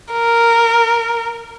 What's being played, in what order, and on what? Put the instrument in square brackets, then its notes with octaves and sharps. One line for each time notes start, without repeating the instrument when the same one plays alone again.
[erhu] A#4